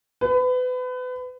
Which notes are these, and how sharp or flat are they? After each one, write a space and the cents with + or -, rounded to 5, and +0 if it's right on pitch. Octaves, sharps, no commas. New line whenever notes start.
B4 +30